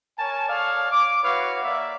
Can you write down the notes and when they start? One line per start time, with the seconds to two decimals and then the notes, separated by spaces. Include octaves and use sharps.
0.18 A#4 C#5 G#5 A5
0.48 A4 C#5 D5 F5
0.90 D6
1.23 E4 F#4 B4 C#5 F5
1.63 A#3 D5 E5